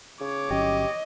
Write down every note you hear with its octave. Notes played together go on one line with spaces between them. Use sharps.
C#3 C#5 D6
G1 F#3 C#4 G4 D#5